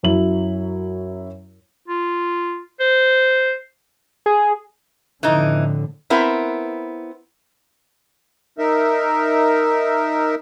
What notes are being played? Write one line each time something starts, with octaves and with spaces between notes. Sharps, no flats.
F#2 F#3 E4 F#7
F4
C5
G#4
F2 A2 D3 E3 D#4
B3 C4 E4 A#4
D#4 A#4 E5